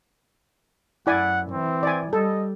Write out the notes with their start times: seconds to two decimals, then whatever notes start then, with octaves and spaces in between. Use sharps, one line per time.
1.07 F#2 E4 D5 F#5 G#5
1.51 E3 C4
1.83 D5 G#5
2.13 G3 A4 D#5